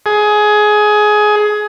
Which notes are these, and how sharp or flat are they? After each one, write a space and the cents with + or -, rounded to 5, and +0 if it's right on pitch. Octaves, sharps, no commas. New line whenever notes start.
G#4 +20